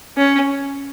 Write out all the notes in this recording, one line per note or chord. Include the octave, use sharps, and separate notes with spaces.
C#4